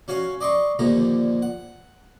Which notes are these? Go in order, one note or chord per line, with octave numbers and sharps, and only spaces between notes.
C#4 F#4 C#5 F5 G#5
D5 D#5 C6 C#6
D#2 A#2 D3 F3 A#5
F#5